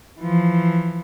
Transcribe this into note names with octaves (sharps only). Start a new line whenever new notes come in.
E3 F3